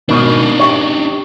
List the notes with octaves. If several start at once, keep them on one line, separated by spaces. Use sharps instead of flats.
G#2 B2 D#3 D4 D#4
G4 C#5